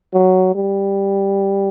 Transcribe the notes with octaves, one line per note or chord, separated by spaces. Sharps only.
F#3
G3